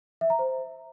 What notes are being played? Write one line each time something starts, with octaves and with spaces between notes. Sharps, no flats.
E5
A#5
C5